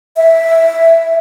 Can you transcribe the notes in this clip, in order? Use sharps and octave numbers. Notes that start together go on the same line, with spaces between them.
E5